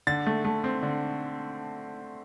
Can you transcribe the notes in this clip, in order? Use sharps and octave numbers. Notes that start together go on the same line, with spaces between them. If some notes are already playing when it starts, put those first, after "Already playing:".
D3 A6
A3
A3
C4
D3